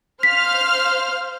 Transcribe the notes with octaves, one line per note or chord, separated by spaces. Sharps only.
C5 F5 F6 B6